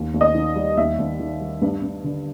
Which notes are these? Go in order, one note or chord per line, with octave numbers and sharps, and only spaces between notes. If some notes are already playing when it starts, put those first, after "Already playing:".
Already playing: D#2
D#2
D#5
D#3
G3
D#2 E5
D#2
D#3
G3
G2
G2
D3